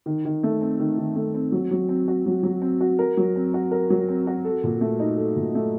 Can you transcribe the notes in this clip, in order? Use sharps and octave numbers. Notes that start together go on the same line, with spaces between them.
D#3
D#3
A3
C4
D#3
D#3
A3
C4
F#3
F#3
C4
F#4
F#3
F#3
C4
F#4
A#4
F#3
C4
F#4
A#4
F#3
C4
F#4
A4
A#2
A3
D#4
A4
A#2
A3